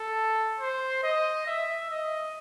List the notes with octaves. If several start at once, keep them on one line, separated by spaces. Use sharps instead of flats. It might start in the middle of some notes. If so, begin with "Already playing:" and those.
Already playing: A4
C5
D#5
E5
D#5